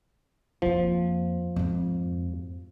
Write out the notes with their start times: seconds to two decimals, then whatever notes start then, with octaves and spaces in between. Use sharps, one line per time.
0.62 F2 F3 A#3
1.56 F2 G#2